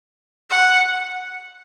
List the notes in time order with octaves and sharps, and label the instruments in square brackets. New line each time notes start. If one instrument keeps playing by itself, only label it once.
[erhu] F#5